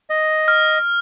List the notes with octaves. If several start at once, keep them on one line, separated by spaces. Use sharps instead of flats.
D#5
F6